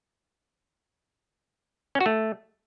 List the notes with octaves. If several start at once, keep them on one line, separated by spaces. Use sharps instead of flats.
C#4
F#4
A3